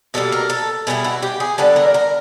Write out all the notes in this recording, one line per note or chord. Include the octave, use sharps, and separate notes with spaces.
B2 G3 A#3 A4
A#4
A4
B2 G3 B3 E4 G#4
F#4
G4
G#4
D3 G3 B3 D4 A4
A#4
A#4